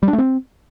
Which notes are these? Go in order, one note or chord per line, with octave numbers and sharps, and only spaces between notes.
G3
D4
A3
C4